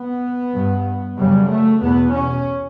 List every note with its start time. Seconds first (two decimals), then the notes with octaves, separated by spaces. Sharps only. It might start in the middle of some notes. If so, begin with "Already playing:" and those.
Already playing: B3
0.54 G2
1.18 F#2 C#3 G3
1.49 A3
1.81 E2 B2 B3
2.13 C#4